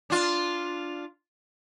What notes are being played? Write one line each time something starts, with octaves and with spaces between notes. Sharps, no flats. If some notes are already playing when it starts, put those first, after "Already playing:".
D4 F4